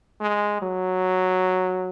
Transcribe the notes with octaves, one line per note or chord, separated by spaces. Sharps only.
G#3
F#3